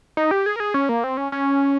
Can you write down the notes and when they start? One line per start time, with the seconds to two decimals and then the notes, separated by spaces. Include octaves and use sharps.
0.17 D#4
0.31 G4
0.46 G#4
0.56 A#4
0.60 G#4
0.74 C#4
0.89 A#3
1.04 C4
1.17 C#4
1.32 C#4